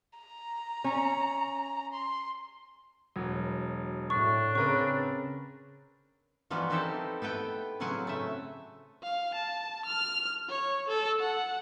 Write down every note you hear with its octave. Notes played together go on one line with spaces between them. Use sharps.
A#5
C#4
C6
E1 F#3
A2 D4 C#6
C#3 C4 A#4 B4 C#6
E3 F3 G3 B3 D#4 F#4
C4 D#4 E4 G4 A4 C5
B3 A4 B4 G5
A2 C#3 F#3 C4 F#5 G#5
A3 E5
F5
A5
F6
C#5
A4
F#5